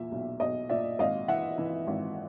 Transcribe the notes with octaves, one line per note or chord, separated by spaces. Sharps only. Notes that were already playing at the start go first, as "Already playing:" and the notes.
Already playing: E2 A#2 E5
B1
B1 D#5
A#2 D5 E5
G#1 D#5 F5
E3 E5 F#5
E3
G#1